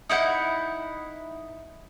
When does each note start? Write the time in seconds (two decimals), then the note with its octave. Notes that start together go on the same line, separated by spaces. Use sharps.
0.10 D#4 E4 F#5 G6